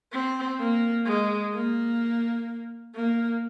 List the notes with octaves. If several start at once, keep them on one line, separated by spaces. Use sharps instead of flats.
C4
A#3
G#3
A#3
A#3